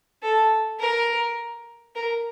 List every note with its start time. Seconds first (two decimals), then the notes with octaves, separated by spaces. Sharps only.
0.23 A4
0.79 A#4
1.95 A#4